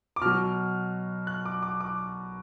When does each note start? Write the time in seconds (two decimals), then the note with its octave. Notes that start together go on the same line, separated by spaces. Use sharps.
0.16 D6
0.22 B2 F#3 F6
1.27 F#6
1.45 D6
1.63 D6
1.80 D6